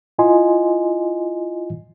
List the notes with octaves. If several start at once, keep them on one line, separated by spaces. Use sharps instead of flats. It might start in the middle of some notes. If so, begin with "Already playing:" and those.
E4 F4 D#5 G#5 C6